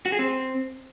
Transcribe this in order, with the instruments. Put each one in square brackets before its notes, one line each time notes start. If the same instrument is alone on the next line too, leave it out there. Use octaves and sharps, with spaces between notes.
[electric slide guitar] F#4
G#4
C4